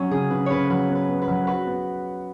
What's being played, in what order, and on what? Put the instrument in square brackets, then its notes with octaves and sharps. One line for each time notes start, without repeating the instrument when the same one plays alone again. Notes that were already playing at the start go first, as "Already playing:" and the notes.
Already playing: [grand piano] F#3 [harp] C#4
[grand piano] C#3 [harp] G#4
[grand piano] C#3 [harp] B4
[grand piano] C#3 [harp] B4 C#5
[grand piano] F#3 [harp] B4
[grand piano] B3
[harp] B4
[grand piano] B3
[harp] B4
[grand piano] F#3
[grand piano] F#4 [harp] B4
[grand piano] B3